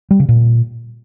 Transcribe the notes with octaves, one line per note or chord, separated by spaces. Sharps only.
G3
C#3
A#2